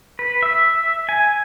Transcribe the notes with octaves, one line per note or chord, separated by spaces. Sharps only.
B4
E5
G#5